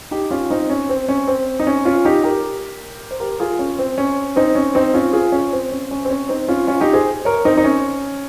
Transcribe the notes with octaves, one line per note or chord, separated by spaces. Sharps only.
D#4 G4
C#4 F4
C4 D#4
C#4
C4
C#4
C4
D#4
C#4
C#4 F4
D#4 G4
G4 A#4
C5
G4 A#4
F4 G#4
C#4
C4
C#4
C4 D#4
C#4
C4 D#4
C#4 F4
F4 G#4
C#4
C4
C#4
C#4
C4
C#4
C4 D#4
C#4 F4
C#4 F4
D#4 G4
G#4 C5
A#4 C#5
C4 D#4
D#4
C#4